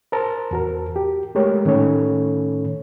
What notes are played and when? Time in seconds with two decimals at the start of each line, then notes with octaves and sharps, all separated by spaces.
0.12 A#4 C5 A5 A#5
0.51 E2 F#4 A#4
0.96 G4
1.35 G#3 A3 G4 A#4 C#5
1.65 A2 D#3 C#4 A4 C#5